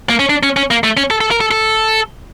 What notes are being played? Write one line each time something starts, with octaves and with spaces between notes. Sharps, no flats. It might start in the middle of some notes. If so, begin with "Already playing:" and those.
A#3
C#4
D4
C#4
C#4
A#3
A3
C#4
A4
A4
A#4
A4
A4